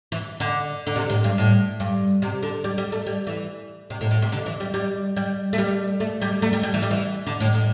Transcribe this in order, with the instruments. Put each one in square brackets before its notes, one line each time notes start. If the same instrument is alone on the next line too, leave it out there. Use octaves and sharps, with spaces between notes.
[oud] E3
D3
D3
C3
A2
G2
A2
G2
C3
D3
G3
G3
A3
G3
E3
C3
A2
A2
C3
D3
E3
G3
G3
G3
A3
G3
A3
G3
A3
G3
G3
E3
G3
E3
D3
A2
A2